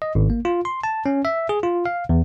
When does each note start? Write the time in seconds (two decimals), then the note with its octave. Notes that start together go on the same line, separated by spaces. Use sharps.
0.02 D#5
0.15 G#1
0.30 A#3
0.45 F4
0.65 C6
0.84 A5
1.06 C#4
1.25 E5
1.49 G#4
1.63 F4
1.86 F5
2.09 E2